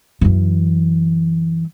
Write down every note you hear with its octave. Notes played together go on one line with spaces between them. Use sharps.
F#2 E3